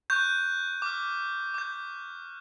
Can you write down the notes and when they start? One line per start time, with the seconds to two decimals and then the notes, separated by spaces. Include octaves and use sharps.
0.10 C#6 F#6 G6
0.82 D6 F6
1.54 D6 G6